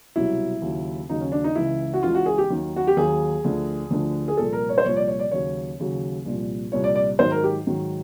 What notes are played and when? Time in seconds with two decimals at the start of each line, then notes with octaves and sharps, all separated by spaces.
0.16 C2 B2 F#3 E4
0.62 D#2 C#3 F#3
1.09 D#2 C#3 F#3 D#4
1.20 C#4
1.32 D4
1.44 D#4
1.55 C#2 C#3 E3 E4
1.94 F#4
2.03 C#2 C#3 E3 F4
2.15 F#4
2.26 G#4
2.38 G4
2.50 D#2 D#3 F#3
2.76 F#4
2.87 G4
2.96 D#2 D#3 F#3 G#4
3.44 D2 D3 F3
3.90 D2 D3 F3
4.28 G#4
4.37 C2 A#2 F3 A4
4.53 A#4
4.69 C#5
4.78 C5
4.85 C2 A#2 F3 C#5
4.96 D5
5.08 C#5
5.19 D5
5.31 D#2 C#3 F#3 C#5
5.79 D#2 C#3 F#3
6.25 C2 A#2 F3
6.72 C2 A#2 F3 C#5
6.84 D5
6.95 D5
7.19 G#2 D#3 F#3 C5
7.32 A#4
7.44 G4
7.67 G#2 D#3 F#3